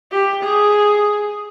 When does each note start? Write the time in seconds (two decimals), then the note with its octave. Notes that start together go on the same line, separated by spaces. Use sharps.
0.12 G4
0.43 G#4